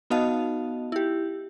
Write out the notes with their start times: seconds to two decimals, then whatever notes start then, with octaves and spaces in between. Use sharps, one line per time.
0.10 B3 D#4 F#4 D#5 F5 A5
0.92 E4 G4